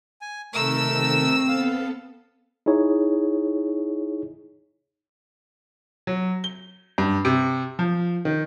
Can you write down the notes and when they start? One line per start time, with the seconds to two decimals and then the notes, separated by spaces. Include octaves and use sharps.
0.21 G#5
0.54 C3 D#3 A3 A4 A#4 E6
0.94 C4
1.48 B3 A4 F5
2.66 D#4 E4 G#4 C#5
6.07 F#3
6.44 G7
6.98 G2
7.25 C3
7.79 F3
8.25 D#3